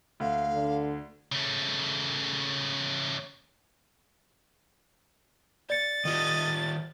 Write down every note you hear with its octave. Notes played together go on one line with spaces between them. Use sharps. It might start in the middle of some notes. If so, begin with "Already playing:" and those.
D2 A3 F5
D3
C#3 A3
D5 A6 C#7
D#3 F4 G4 D#5